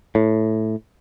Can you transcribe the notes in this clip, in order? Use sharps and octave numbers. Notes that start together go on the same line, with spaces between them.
A2